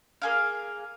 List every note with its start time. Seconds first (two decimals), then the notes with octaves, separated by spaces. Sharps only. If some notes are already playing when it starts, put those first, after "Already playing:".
0.22 A#3 G#4 F5